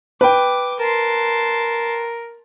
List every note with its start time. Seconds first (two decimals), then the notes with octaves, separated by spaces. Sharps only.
0.21 B4 G5 D6
0.79 A#4 A5 C6